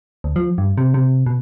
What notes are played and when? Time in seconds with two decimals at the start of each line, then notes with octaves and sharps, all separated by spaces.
0.24 D2
0.36 F3
0.58 G2
0.78 C3
0.94 C3
1.26 B2